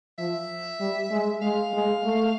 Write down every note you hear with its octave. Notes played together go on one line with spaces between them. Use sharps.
F3 E5
G3
G#3
G#3 F5
G#3
A3